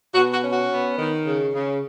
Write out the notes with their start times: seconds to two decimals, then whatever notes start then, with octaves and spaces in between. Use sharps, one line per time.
0.14 B2 F#4
0.33 F#4
0.42 C#4
0.52 F#4
0.70 B3
0.98 D#3
1.26 C#3
1.54 C#3